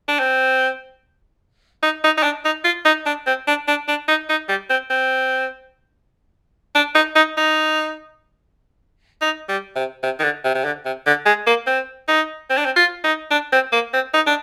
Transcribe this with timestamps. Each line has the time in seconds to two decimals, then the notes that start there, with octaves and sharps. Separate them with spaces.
0.08 D4
0.19 C4
1.83 D#4
2.04 D#4
2.18 D#4
2.23 D4
2.45 D#4
2.65 F4
2.85 D#4
3.06 D4
3.27 C4
3.47 D4
3.68 D4
3.88 D4
4.08 D#4
4.30 D#4
4.49 G3
4.70 C4
4.90 C4
6.75 D4
6.95 D#4
7.16 D#4
7.37 D#4
9.22 D#4
9.49 G3
9.76 C3
10.03 C3
10.20 D#3
10.23 D3
10.44 C3
10.55 C3
10.65 D3
10.85 C3
11.06 D3
11.26 G#3
11.47 A#3
11.67 C4
12.08 D#4
12.50 C4
12.58 D4
12.65 C4
12.76 F4
13.04 D#4
13.31 D4
13.52 C4
13.73 A#3
13.94 C4
14.14 D#4
14.27 D4